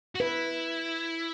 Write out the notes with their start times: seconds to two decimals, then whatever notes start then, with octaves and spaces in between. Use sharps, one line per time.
0.15 F#4
0.20 E4 B4